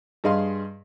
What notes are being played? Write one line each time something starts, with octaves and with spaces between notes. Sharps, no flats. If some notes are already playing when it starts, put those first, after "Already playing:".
G2 G#4 D#5 F5 C6